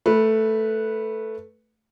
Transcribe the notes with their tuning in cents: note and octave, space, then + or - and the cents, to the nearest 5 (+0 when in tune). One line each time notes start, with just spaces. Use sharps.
A3 +0 B4 -10